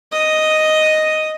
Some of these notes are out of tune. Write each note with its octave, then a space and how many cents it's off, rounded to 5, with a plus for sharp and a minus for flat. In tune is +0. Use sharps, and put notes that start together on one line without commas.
D#5 +0 D#6 +0